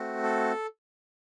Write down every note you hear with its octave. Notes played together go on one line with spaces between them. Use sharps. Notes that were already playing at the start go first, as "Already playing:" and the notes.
Already playing: A3 C4 F#4
A4